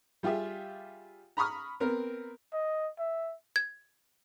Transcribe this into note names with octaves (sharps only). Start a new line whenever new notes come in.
G3 F4 G4 G#4 E5
A#5 B5 C#6 D#6 F6
B3 C4 A#4
D#5
E5
G#6